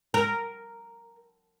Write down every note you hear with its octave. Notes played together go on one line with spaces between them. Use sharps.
A#4